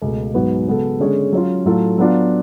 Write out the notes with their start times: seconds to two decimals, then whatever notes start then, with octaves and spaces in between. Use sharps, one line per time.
0.02 C#2 B2 A3
0.34 G#2 F#3 B3 F#4 B4
0.67 C#3 G#3 B3 F#4 A4
1.00 D3 G#3 C#4 G#4 C#5
1.33 F#3 C#4 F4
1.65 A2 F#3 A3 F4 A4
1.98 F#3 B3 D4 F4